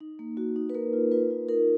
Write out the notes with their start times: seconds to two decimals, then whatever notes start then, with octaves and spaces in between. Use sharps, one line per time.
0.01 D#4
0.19 A#3
0.37 F#4
0.56 D#4
0.70 B4
0.75 A#3 A#4
0.93 F4
1.12 F4 B4
1.30 F4
1.49 D#4 A#4